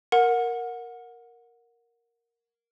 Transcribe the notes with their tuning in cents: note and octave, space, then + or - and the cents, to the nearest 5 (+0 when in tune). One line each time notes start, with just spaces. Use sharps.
A#4 +0 F#5 -20